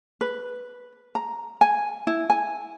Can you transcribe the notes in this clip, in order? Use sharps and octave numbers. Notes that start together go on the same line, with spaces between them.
B4
A#5
G#5
E4
G#5